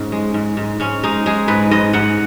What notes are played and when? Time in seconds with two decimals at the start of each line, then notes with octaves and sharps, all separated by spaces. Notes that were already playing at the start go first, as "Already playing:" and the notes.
Already playing: G#2 C#4
0.12 G#3
0.34 G#2
0.57 G#2
0.80 G#2 C#4
1.03 G#3 D#4
1.26 G#3 G#4
1.48 G#2 B4
1.71 G#2 D#5
1.93 G#2 F#5